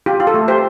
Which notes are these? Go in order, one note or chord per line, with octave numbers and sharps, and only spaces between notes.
F4 G4
F4
A4
A3
G4 C5